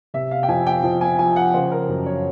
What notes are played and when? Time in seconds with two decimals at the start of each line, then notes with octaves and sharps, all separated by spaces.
0.14 C3 E5
0.31 F5
0.43 G5
0.49 F2 G#5
0.67 G5
0.84 F2
1.01 G#5
1.19 F3 G#5
1.36 F#5
1.54 C#3 C5
1.71 A#4
1.89 F#2
2.06 C#5